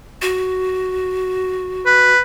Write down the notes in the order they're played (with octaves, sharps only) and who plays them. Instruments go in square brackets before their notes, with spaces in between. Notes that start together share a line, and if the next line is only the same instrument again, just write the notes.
[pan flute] F#4
[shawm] B4